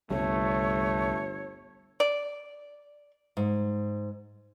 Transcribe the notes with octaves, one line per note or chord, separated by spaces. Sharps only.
G1 C2 G3 A3 C#5
D5
G#2